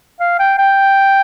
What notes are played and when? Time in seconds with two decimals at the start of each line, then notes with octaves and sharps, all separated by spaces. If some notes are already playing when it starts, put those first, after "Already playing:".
0.20 F5
0.39 G5
0.58 G5